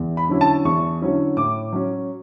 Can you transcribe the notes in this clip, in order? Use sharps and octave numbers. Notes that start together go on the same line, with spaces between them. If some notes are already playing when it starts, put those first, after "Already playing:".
Already playing: E2
B5
D3 F#3 C#4 E4
A5
E2 C#6
D3 F#3 C#4 E4
A2 D6
F#3 C#4